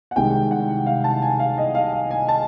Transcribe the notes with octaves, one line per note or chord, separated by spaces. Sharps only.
F#5
C2 C3 D#3 G#3 G5
F#5
F5
A5
G#5
F5
D#5
F5
F5
G#5
A5